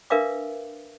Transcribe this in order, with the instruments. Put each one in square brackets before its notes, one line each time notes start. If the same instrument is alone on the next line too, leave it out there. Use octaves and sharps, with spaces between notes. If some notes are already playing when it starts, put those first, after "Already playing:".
[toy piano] D4 A#4 B4 E5 F5 D6